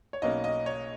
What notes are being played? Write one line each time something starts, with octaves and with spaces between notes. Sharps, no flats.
C#5
B1 B2 A#3 C#4 D#5
D#5
C#5